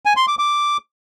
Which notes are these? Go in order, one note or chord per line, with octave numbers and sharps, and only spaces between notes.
G#5
C6
D6
D6